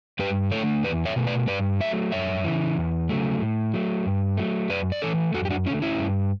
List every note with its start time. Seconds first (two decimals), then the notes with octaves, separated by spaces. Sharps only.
0.19 G2 G4 B4
0.52 D3 A3 A4 C#5
0.84 E2 B4 D5
1.05 C#5 E5
1.16 B2 A3
1.27 B4 D5
1.48 G2 B4 D5
1.81 F#3 A3 C#5 E5
2.12 F#2 C#5 E5
2.44 C#3 E3
2.77 E2
3.09 C#3 F#3 A3
3.41 A2
3.74 F#3 A3
4.06 G2
4.37 F#3 A3
4.70 F#2 B4 D5
4.92 D5
5.02 E3 A3 A4 C#5
5.34 F#2 F#4 A4
5.45 G4
5.50 D4 F#4
5.66 D3 C#4 E4
5.71 A3
5.82 C#4 E4
5.98 G2